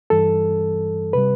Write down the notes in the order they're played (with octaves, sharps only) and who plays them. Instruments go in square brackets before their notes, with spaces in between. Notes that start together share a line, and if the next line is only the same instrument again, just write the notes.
[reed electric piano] G2 E3 G3 A4
C3 G3 B4